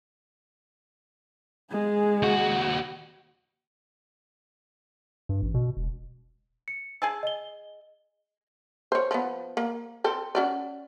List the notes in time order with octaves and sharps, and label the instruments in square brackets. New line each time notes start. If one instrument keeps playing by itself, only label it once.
[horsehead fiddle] G#3 G#4
[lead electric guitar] D#2 F#4
[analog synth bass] G2
A1
B2
E1
[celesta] C#7
[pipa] G#4 G#5 A5 [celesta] E6
[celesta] D#5 G7
[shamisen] C5 C#5
F3 B3
A#3
C4 A4
C#4 F#4 D5